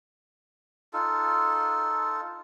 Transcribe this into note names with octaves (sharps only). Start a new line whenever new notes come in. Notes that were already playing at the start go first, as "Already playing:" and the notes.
D#4 F4 A4